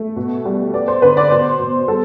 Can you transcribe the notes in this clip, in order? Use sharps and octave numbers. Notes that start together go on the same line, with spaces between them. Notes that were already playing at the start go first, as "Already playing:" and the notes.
Already playing: A3
B2
G3
B3 D5
C5
D3 B4
D5
B2 C5
B2
G3 A4